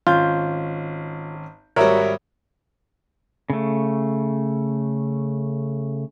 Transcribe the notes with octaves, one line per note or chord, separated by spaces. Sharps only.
G#1 C#4 F4 G6
G#1 G3 F#4 A#4 C#5 E5
C#3 A3